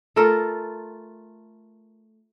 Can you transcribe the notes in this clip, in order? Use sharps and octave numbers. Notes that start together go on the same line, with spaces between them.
A3 F4 A4 A#4